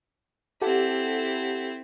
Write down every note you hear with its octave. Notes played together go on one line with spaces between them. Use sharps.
C4 E4 G4 A4 F#5